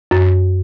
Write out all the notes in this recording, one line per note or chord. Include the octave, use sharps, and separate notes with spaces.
F#2